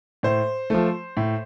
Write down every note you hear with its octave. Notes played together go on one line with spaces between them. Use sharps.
A2 C5
F3 A3
A2